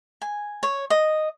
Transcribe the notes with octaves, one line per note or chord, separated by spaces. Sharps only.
G#5
C#5
D#5